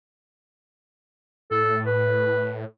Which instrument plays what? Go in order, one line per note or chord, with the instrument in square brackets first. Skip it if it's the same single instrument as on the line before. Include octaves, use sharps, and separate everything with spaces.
[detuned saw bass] A2 [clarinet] A4
[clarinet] B4